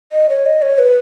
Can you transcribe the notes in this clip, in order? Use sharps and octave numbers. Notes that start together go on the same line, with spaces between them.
D#5
C#5
D#5
C#5
B4